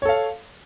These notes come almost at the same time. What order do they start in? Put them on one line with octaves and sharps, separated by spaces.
C#5 A4 F5